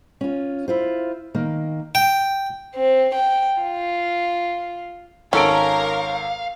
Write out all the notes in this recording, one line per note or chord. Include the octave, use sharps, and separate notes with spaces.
C#4 F4
E4 F4 C5
D#3 A#3
G5
C4
G5
F4
G#1 C#4 A4 A#4 F5 D7